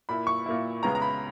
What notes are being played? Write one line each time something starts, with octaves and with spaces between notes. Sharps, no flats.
A#2 A#3 E4 B5
C#6
A#2 A#3 E4
C#2 C#3 G#3 B3 A#5
A#5
B5